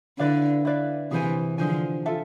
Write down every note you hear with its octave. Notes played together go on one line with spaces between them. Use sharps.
D3 E4 B4 D5 F5
E4 B4 D5 F5
C3 E3 G#4 C5 G#5
D3 F3 G#4 C5 G#5
F4 A4 E5 A5